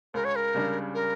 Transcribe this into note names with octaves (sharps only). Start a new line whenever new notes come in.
C#2 A#4
C#5
A#4
C#3 G3 D4
A#4